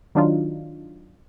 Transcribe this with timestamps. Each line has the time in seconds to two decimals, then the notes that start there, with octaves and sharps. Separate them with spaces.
0.15 D#3 F#3 D4 D#4 F4